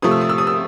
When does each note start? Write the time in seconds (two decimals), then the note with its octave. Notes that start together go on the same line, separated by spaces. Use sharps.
0.02 C3 F3 A3 D#6
0.11 E6
0.21 D#6
0.29 E6
0.38 D#6
0.47 E6